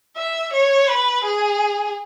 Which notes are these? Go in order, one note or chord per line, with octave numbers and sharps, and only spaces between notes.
E5
C#5
B4
G#4